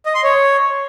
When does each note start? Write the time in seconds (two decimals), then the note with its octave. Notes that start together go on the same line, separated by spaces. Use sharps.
0.06 D#5
0.15 C6
0.23 C#5